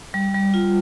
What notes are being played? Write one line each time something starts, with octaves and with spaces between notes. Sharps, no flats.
G3
G3
F4